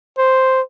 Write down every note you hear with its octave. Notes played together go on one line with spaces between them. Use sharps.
C5